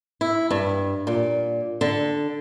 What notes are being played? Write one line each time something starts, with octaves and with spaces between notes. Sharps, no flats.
E4
G2
A#2
D3